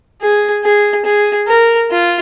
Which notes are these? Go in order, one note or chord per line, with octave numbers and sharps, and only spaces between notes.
G#4
G#4
G#4
A#4
F4